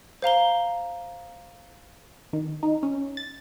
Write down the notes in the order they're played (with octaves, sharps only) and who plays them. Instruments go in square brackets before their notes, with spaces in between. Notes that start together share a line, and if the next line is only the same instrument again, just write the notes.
[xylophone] C5 F5 A#5 G7
[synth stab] D#3
D#4
C#4
A6